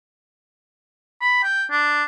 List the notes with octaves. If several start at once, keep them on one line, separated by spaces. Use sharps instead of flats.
B5
G5
D4